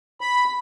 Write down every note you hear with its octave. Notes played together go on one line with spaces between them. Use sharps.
B5